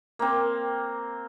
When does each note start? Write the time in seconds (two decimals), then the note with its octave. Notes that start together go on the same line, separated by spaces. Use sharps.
0.19 A#3 C4